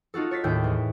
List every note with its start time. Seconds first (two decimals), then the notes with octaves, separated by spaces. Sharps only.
0.14 D#4 F4 F#4 A4
0.31 C#5 A6 B6 C7
0.44 D#2 A2 E5 G5 G6
0.64 E2